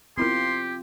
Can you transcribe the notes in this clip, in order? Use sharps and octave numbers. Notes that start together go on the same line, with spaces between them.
B3 C4 E4 F4 G4 A#4 C6